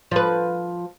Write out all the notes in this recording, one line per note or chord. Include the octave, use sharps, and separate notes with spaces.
F3 B4